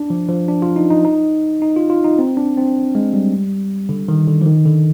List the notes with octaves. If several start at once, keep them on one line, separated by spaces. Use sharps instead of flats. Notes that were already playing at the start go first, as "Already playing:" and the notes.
Already playing: D4
F3
F3
D4
F4
D#4
D#4
D#4
D#4
F4
F4
D#4
C4
D4
C4
G#3
G3
D3
D#3
D3
F3
D#3
D3